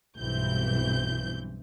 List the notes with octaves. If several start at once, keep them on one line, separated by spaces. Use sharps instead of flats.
B1 G2 E3 C4 G6